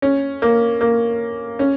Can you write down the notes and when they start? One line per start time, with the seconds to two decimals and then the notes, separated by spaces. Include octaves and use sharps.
0.02 C#4
0.42 A#3
0.81 A#3
1.59 C#4